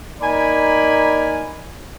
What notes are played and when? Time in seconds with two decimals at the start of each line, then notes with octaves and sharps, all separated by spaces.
0.21 A#3 D#4 D5 G#5 B5